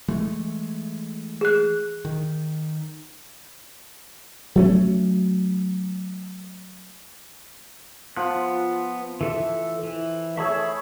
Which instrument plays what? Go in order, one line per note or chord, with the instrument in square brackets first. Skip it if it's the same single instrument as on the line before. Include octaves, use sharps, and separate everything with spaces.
[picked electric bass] E3 G#3 A3
[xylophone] G#4 F#6
[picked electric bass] D#3
[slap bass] F#3 A3 C#4
[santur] F3 F4 [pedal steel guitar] B3 F#6
[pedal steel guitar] E3 A4 E5
E3
[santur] A3 G#4 C#5 [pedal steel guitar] E5 B5 E6